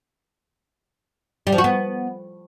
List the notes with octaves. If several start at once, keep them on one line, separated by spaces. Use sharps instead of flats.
G3
F3
F#4
B3